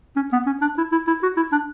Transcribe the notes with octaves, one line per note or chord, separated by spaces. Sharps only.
C#4
B3
C#4
D4
E4
E4
E4
F#4
E4
D4